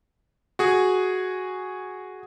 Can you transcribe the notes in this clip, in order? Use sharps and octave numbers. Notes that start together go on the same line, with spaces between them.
F#4 G#4